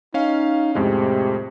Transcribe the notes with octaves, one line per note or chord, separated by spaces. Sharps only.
C#4 D#4 F5
F2 A2 C3 G#3